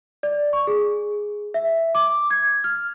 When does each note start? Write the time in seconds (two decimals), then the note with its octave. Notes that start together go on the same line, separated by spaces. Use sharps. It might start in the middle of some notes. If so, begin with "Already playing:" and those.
0.23 D5
0.53 C#6
0.67 G#4
1.54 E5
1.95 D6
2.31 G#6
2.64 F6